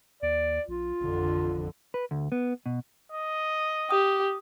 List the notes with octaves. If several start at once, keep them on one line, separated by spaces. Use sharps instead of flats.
D#2 D5
A#1 F4
A1 F2 D3
B4
D2
B3
B2
D#5
G4 D#6